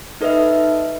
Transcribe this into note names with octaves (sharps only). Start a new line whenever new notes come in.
D#4 A4 B4 D#5 E5